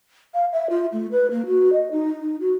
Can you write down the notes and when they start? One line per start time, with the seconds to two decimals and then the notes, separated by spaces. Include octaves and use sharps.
0.34 F5
0.52 E5
0.70 F4
0.92 A3
1.12 B4
1.30 A#3
1.46 F#4
1.72 D#5
1.91 D#4
2.20 D#4
2.40 F#4